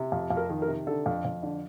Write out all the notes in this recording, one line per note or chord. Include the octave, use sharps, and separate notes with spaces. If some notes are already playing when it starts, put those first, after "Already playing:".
Already playing: C3
F2
F2
A#4
D#3
A#4
C3
D3 A4
F2
F2
D3